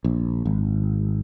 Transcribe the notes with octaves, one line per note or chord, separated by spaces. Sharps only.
A#1
G#1